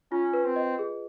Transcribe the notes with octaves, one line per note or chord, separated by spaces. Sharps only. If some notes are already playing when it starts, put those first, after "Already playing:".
C#4 F4
B4
C4
D#5
G#4